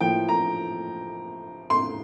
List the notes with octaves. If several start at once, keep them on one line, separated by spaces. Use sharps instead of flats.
A2 F3 A#3 G5
A#5
C6